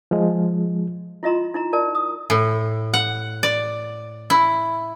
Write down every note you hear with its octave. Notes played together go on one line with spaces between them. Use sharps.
F3 G#3
E4 F4 D#5 A#5 C6
D#4 E4 A#5
A#4 D5 A5
D#6
A2
F#5
D5
E4